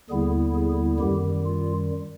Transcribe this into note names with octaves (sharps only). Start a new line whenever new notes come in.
D#2 D3 G3 B3 E4 G#4
G#4
F#2 D#3 G3 G4
F4